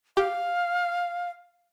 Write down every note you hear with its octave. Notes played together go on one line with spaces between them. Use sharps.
G4 F5